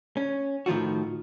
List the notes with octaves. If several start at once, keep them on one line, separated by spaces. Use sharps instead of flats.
C#4
A2 D#3 F3 F4 F#4